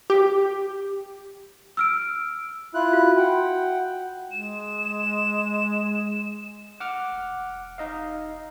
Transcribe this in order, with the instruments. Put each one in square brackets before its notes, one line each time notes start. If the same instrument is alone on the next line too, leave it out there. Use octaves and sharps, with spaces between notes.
[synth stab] G4
[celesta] E6 F6 D7
[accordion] E4 F4 F#6
[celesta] F#4
[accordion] F#5 G5
[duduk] G#3 [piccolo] E7
[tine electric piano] F#5 D6 F6
[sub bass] E1
[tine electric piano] D#4 D#5 F5